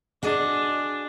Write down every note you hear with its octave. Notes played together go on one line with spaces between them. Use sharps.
D4 F#4 G#4 D#5